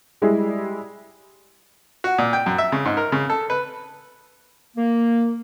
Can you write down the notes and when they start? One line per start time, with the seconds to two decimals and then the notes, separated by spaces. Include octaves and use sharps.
0.22 G3 G#3 E4 G4 G#4
2.04 F#4
2.18 A#2
2.33 G5
2.46 F#2
2.58 E5
2.72 C#3
2.85 G#2
2.97 A#4
3.12 C#3
3.30 A4
3.50 B4
4.76 A#3